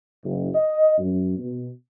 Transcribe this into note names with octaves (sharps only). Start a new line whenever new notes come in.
F#1
D#5
F#2
B2